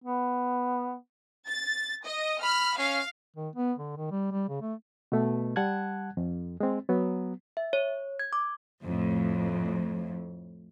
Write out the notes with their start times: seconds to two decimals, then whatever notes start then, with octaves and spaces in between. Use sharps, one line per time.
0.04 B3
1.48 A6
2.06 D#5
2.43 B5 F6
2.78 C#4 F5
3.36 D#3
3.56 B3
3.78 D3
3.97 D#3
4.11 G3
4.32 G3
4.49 C#3
4.62 A3
5.12 B2 A3
5.56 G3 F#5 A5 F#6 G#6
6.17 F2
6.60 G#3 C4
6.89 F#3 B3
7.57 E5
7.73 C#5
8.19 G#6
8.33 D6
8.82 F2 A2